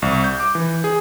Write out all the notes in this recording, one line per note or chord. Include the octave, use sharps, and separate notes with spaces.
C2
G6
D6
E3
G#4